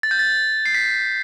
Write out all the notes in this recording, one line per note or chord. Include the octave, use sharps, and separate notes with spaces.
A6
G6
A6
C7
B6